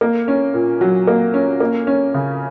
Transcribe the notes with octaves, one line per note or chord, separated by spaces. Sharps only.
A#3
C#4
A#2
F#3
A#3
C#4
A#3
C#4
C#3